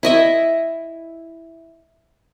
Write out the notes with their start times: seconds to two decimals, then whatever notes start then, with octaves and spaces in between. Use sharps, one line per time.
0.03 E4 D#5 E5